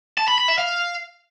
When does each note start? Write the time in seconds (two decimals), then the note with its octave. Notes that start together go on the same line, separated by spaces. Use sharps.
0.18 A5
0.28 B5
0.38 B5
0.48 E5
0.58 F5